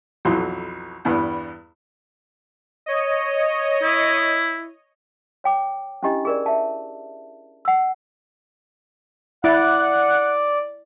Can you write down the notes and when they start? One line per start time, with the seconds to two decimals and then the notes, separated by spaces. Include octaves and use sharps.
0.25 B1 F2 E3 F#3 C6
1.05 E2 G2 G3 B3
2.86 C#5 D#5
3.83 E4
5.44 C#5 G5 D6
6.03 C#4 D4 E4 G4 D#5
6.25 G#4 A#4 D5
6.46 E5 A5
7.65 F#5 E6
9.44 E4 D5 F#5